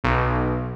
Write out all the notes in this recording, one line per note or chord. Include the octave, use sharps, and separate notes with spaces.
B1